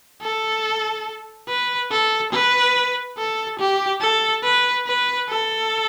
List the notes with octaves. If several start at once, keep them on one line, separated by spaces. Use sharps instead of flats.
A4
B4
A4
B4
A4
G4
A4
B4
B4
A4